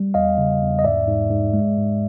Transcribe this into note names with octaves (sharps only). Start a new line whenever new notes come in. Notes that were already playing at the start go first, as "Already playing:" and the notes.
Already playing: G3
E2 D#5 F5
C#3
E2
D#5
G#2 D5 E5
G#2
G#2
G#3
G#2